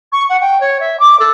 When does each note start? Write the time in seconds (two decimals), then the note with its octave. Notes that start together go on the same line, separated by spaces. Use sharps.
0.12 C#6
0.29 F#5
0.40 G5
0.60 C#5
0.80 E5
0.99 D6
1.19 A4